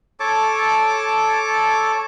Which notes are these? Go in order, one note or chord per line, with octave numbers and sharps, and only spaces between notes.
A4 C#5 A5 D6